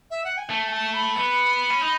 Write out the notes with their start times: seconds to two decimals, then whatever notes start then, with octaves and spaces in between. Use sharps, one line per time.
0.11 E5
0.24 F#5
0.38 G#5
0.50 A3 A5
0.68 G#5
0.72 A5
0.94 B5
1.16 B3
1.70 C#4
1.81 D#4